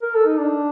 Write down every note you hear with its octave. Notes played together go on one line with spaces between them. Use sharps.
A#4
A4
D#4
D4